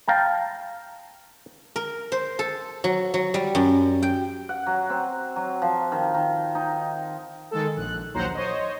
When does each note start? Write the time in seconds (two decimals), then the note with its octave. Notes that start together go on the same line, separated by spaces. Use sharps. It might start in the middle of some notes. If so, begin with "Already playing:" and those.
0.08 F5 G5 A5 A#5
1.76 A#4
2.12 C5
2.39 A4
2.84 F#3
3.14 F#3
3.34 G3
3.55 F#2
4.02 G5
4.49 F#5
4.67 F#3
4.90 C4
5.36 F#3
5.62 F3
5.92 D#3
6.14 D#3
6.55 D#4
7.51 D#3 G#3 A4
7.77 A#1 F#6
8.14 A#1 D#2 F#3 C5 F#5 A#5
8.34 C5 C#5 D#5